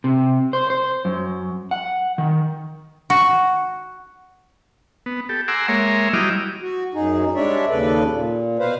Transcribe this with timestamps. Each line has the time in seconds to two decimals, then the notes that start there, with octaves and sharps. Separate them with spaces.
0.04 C3
0.53 C5
0.70 C5
1.05 F#2
1.71 F#5
2.18 D#3
3.10 F#4
5.06 B3
5.29 G4 A4
5.48 F#5 G#5 A#5 C6 D6 E6
5.68 G#3 A#3 C#5 E5 A#5 C6
6.13 F#3 G3 E4 D#5 D6 F6
6.62 F#4
6.94 F#2 D#4 G#4
7.35 G3 G#3 D4 C#5 D5 E5
7.69 D#2 C#3 A4 B4 D5
8.10 A#2
8.59 B2 B4 C5 F5